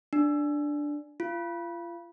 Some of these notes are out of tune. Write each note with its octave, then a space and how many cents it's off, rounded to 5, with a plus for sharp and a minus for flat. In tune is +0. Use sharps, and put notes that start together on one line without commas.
D4 +0
F4 -30